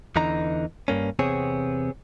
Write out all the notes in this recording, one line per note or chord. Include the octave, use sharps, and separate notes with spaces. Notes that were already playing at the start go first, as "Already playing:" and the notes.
E2 D3 E3 D#4 D#5 A#5
G2 A#3 C#4
E2 C3 B3 C4 G#4 C#5